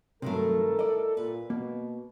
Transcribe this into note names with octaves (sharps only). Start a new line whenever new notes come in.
G2 C3 D#3 F#3 A3 A4 A#4
E4 D5 D#5
A#2 B4
B2 A#3